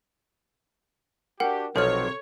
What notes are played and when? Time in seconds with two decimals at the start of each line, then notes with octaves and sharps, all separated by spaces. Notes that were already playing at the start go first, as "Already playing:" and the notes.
1.40 D4 F#4 G4 A#4 F#5 G5
1.76 B1 C3 F3 F#3 C4 A4 C#5 F6